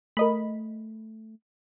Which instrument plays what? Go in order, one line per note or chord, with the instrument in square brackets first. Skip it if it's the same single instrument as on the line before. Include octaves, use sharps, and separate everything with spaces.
[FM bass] A3 [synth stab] A#4 D#5 B5